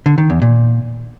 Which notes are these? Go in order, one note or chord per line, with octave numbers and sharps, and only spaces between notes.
D3
D#3
E2
A#2